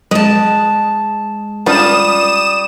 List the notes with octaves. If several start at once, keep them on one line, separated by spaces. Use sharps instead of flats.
G#3 D#5 A5
G3 C#4 D4 F4 D#6 E7